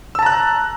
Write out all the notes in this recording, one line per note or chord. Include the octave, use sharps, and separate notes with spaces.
A5 A#5 E6 F#6